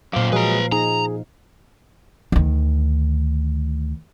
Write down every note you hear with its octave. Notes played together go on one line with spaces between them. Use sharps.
F#2 A#2 C5 F5 D6
F3 F#3 G#3 G#4 B4 A#5
D#4 G#4 A#5
D2 D#3